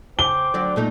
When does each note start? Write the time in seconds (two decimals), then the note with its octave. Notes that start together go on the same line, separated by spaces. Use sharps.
0.19 C#3 C5 G5 D6 G7
0.54 D3 F#3 D5
0.76 A#2 A3 D#4